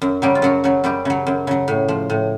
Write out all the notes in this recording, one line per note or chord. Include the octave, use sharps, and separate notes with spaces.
F#2
C#3 F#3 G3 G4
F4
F#2 F#3 F#4
C#3 F#3
F#2 G3 G4
C#3 F#3
F#2
C#3 F#3
A2
F3
A2